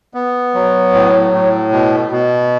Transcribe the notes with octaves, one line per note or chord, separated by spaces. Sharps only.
B3
F#3
A2
A2
B2
B2